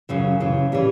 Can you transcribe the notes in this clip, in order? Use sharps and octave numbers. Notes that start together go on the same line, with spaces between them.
F#2 C#3 E3
F#2 C#3 E3
E3 G3 C#4